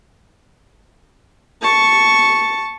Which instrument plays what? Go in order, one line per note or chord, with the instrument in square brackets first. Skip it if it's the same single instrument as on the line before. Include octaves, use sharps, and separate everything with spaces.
[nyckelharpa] A5 C#6